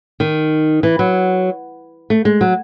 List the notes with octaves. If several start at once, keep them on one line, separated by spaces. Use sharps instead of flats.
D#3
E3
F#3
A3
G#3
F#3